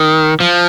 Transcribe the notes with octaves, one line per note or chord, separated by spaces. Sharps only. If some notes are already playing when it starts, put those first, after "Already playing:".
Already playing: D#3
F3